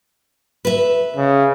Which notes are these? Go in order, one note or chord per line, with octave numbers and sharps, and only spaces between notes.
B4 E5
C#3